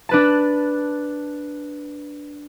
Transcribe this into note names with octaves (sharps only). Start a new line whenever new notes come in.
D4 B4 A5